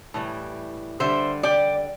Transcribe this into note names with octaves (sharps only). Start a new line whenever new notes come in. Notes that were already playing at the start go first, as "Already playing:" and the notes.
A2 E3 G3
D3 G3 C5 E5
D5 G5